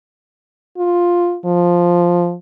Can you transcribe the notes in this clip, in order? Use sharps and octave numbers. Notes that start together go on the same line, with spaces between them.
F4
F3